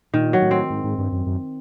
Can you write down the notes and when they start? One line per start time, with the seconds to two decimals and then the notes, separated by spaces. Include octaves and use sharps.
0.14 A#2 D#3
0.33 F#3
0.42 A2
0.51 C4
0.70 G#2
0.84 G#2
0.98 G2
1.12 F#2
1.27 F#2